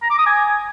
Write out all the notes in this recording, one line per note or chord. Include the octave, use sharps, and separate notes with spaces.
A#5
D6
D#6
G#5